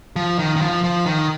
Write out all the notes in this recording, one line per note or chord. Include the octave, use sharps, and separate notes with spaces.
F3
D#3
D#3
F3
F3
D#3